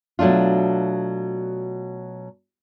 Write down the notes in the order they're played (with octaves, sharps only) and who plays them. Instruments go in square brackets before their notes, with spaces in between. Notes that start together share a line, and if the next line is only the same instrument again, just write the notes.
[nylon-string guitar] B2 F#3 A3 D4 F4